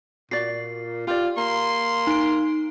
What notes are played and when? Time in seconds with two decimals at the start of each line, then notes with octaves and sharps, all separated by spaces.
0.31 A#2 F#4 D5 C7
1.07 F4 G4 D5
1.38 A#3 C6
2.07 D#4 D7